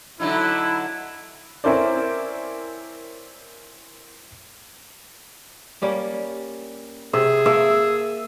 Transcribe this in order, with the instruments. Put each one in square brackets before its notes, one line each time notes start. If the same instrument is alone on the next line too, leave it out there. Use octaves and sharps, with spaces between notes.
[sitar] D3 F#3 D#4 [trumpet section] E4
[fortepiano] C4 C#4 E4 A#4 C5 D5
[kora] G3 A#3 C#4
[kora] C3 [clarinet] G#4 [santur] E6
[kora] A#3 A4 F#5 [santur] E5